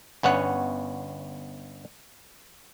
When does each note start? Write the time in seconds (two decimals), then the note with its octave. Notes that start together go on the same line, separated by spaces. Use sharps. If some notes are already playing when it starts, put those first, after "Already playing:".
0.23 G1 B3 C#4 F#5